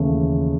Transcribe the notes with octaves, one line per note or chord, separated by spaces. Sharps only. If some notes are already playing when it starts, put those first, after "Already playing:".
Already playing: D#2 C#3 E3 A3